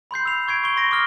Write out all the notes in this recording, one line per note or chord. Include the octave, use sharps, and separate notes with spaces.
B5 C6 G6 C7
E6 F7
C#6 G#6 C7 D7
C#6 G7
C6 A#6 D7
D6 D#6 F6 G7